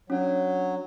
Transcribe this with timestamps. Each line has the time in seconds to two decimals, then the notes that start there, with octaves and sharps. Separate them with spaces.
0.10 F#3 C#4 D4